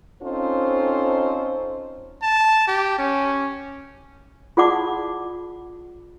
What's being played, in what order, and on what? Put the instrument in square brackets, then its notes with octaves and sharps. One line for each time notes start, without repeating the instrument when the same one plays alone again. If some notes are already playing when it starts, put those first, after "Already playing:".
[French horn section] C4 C#4 D#4 F4 A4 C5
[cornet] A5
G4
C#4
[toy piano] F4 G#4 D5 F#5 A5 D6